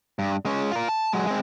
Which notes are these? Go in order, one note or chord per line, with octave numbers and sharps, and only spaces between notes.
G2
G#3 C#4
F4 A#4
A5
F#3 G#3
G#3 C4